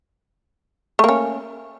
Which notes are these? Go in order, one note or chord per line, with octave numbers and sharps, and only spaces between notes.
A3 A#3 C#4